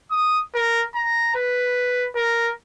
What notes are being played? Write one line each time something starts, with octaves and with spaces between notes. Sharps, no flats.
D#6
A#4
A#5
B4
A#4